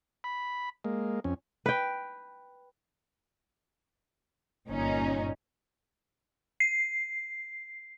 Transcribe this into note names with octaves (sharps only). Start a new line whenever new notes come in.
B5
G#3 A#3
F2 C#4
B4 G5
G1 A#2 C#4 D#4
C7